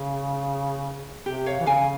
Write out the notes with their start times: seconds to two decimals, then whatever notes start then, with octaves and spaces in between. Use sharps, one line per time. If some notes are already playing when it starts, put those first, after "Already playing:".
Already playing: C#3
1.26 C3 G4
1.46 C#5 F5
1.60 E3
1.66 C#3 F5 G#5